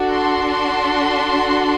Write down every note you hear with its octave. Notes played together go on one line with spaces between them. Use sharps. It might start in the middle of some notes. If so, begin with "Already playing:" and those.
Already playing: D4 F#4 A4
C6